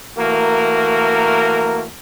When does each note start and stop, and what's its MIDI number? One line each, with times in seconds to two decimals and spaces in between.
0.18 1.84 52
0.18 1.84 57
0.18 1.84 58
0.18 1.84 66
0.18 1.84 70